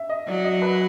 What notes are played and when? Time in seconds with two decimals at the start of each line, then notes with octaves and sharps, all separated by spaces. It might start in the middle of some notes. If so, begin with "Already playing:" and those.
Already playing: E5
0.09 D#5
0.28 F#3 D5
0.44 D#5
0.62 B4